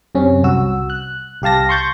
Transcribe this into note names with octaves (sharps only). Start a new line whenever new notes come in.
F#2 C3 C#4
C2 F#4 E6
F#6
C2 G4 F5 A5 A#6
C6 C#6 G6 A6